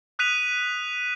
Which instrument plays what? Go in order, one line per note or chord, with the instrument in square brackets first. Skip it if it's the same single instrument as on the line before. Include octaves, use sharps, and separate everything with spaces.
[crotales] D#6 F#6 B6 D#7 F7